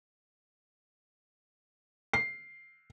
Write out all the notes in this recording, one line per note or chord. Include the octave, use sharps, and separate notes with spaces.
C7